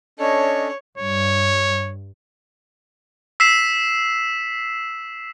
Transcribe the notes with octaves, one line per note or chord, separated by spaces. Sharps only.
C#4 D4 A4 C#5 D#5
G2 C#5
E6 B6 C7 E7